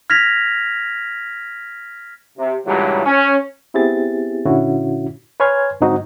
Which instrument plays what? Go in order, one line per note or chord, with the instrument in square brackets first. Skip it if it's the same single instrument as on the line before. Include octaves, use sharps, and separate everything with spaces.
[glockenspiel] F6 G#6 A#6 B6 F7
[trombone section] C3
C#2 G2 A#2 E3 F#3 G3
C#4
[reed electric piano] B3 C4 E4 G4 G#4 A6
A#2 D3 C#4 E4 F#4
B4 C#5 G#5 C6 F6 G#6
G#2 D3 F#3 C4 D#4 F#4